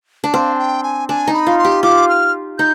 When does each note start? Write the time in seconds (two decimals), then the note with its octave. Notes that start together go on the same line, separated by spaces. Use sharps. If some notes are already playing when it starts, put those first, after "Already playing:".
0.24 D4
0.34 C4 F5
0.55 G#5
0.59 G5
0.83 G#5
1.09 D4 G#5
1.28 D#4
1.34 B5
1.47 F4
1.58 C6
1.65 G4
1.83 F4 D6
2.09 F6
2.59 D#4 G6